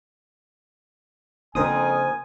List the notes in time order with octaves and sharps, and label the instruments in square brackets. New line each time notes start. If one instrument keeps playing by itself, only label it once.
[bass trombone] F2 [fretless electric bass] C#3 A#3 D4 [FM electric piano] A#4 C5 D#6 [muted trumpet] G#5